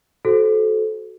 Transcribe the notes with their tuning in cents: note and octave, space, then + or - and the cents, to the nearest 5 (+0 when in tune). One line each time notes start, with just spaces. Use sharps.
F#4 +0 A4 -25 C5 +0